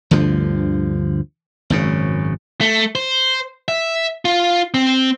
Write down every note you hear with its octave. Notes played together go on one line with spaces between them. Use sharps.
D2 G2 D3 F3
G#1 F#2 C#3
A3
C5
E5
F4
C4